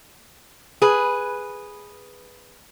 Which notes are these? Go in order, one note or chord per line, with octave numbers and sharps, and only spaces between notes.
G#4 B4